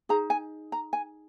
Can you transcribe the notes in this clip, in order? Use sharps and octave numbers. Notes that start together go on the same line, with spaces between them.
D#4 G#4 A#5
G#5
A#5
G#5